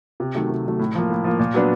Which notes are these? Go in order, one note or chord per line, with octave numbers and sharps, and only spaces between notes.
C3
D#3 F#3 A3
C3
D#3 F#3 A3
A2
F3 A#3
A2
F3 A#3
A#2
F#3 B3 D4